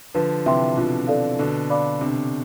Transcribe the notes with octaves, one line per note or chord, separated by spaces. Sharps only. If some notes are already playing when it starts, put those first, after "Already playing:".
D3 F3 B4
C3 E3 E5 G5 C6
B2 D3 F4
A4 D5 F5
B2 D3 A4
D5 F5 B5 D6
C3 D4